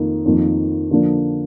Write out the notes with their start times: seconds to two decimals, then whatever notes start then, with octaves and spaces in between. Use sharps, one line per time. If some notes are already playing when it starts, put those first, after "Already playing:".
Already playing: F2 D#3 A#3 D#4
0.25 F2 D#3 A#3
0.91 D3 F3 A#3 D4